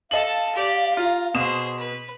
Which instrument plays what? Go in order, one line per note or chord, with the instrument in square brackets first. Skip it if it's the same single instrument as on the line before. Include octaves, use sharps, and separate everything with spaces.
[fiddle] A4 A5 [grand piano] D#5 F#7 [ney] F5
[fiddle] G4 D5
[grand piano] F4 [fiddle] A#5
[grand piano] B2 D#6 E7 [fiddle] G#4 C5
[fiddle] B4